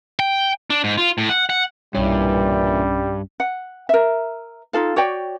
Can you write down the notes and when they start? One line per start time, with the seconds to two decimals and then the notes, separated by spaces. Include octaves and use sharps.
0.19 G5
0.70 D4
0.84 G#2
0.97 F4
1.18 A2
1.29 F#5
1.50 F#5
1.95 B1 G2 A#2 E3 G3 C#4
3.40 F#5
3.89 A#4 E5
4.73 D#4 F4 A4 F5
4.96 F#4 C#5 D5 G5